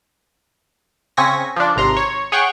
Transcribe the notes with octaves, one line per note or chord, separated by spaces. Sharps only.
C#3 C4 G#5 C#6 A#6 B6
F3 D4
G#1 C3 A#5 C6
C#5
G#4 C#5 F#5 G5 C#6